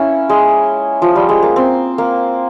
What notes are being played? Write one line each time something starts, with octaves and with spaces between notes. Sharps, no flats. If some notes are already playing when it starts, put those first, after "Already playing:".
Already playing: A#3 C#4 E4
G#3
F3
G3
G#3
A#3
C4
A#3